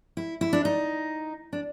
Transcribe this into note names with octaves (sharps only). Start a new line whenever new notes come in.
E4
E4
D4
D#4
D4